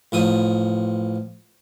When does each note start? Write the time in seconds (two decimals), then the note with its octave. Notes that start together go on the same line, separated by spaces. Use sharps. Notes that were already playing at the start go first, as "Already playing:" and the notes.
0.12 A1 F3 D#6